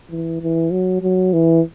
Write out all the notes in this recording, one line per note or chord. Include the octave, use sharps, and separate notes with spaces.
E3
E3
F#3
F#3
E3